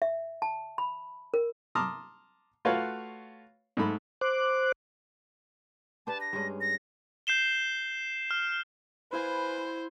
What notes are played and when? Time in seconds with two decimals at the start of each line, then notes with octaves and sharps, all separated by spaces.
0.02 E5
0.42 A5
0.78 B5
1.34 A#4
1.75 A5 A#5 C6 D6 D#6 F6
2.65 A3 F4 F#4 B4 C#5 F5
3.77 G#2 A3 B5
4.21 C5 D6 F#6
6.07 D4 G4 B4 A5
6.21 A#6
6.33 G2 G#3 C#4
6.61 A#6
7.27 G6 C7 E7 G7
8.31 F6
9.13 E4 B4 C5 F5 G#5